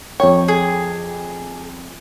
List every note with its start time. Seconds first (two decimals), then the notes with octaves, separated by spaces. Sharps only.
0.20 F2 C#5 G5
0.48 G#4